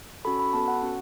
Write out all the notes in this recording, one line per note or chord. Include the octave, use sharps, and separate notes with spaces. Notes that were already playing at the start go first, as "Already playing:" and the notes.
C#4 F#4 A4 B5
B5
B3 F#4 A4 A5
F#5
C#4 F#4